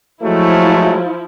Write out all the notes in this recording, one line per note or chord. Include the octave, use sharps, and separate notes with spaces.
F3 F#3 G#3 A3 E4